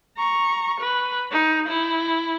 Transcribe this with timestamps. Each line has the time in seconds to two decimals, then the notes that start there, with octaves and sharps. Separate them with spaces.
0.17 A#5 C#6
0.81 B4
1.31 D#4
1.68 E4